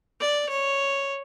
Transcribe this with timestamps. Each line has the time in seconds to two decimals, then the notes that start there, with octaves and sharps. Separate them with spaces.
0.21 D5
0.49 C#5